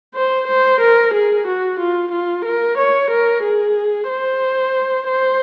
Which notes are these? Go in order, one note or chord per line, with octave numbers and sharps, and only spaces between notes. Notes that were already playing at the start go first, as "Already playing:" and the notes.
C5
C5
A#4
G#4
F#4
F4
F4
A#4
C#5
A#4
G#4
C5
C5